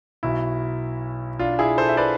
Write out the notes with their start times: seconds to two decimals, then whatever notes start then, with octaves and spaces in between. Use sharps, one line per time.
0.23 B1 B2 E4
1.39 D4 F4
1.59 E4 G#4
1.78 A4 C5
1.89 E5
1.97 B4 D5